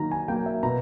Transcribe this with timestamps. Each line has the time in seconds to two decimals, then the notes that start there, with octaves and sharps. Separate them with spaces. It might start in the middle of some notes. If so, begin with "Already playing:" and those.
Already playing: D#3 F#3 A#3 A#5
0.12 G#5
0.28 F#3 A#3 G5
0.46 E5
0.63 B2 A#5